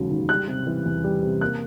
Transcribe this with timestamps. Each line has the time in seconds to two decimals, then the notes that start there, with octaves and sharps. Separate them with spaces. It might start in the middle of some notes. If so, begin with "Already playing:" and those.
Already playing: E1 D#2 C#3 F#3
0.11 D#2
0.29 G3 F#6
0.48 C3
0.67 E3
0.86 E2
1.04 G3
1.23 C3
1.41 A#3 F#6